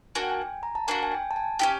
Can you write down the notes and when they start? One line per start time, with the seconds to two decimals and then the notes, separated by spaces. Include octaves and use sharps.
0.15 A#3 D4 F#4 G#5
0.23 G5
0.31 G#5
0.63 A#5
0.75 A5
0.87 A#3 D4 F#4 G#5
1.03 G#5
1.12 G5
1.31 A5
1.36 G#5
1.59 C#4 E4 G4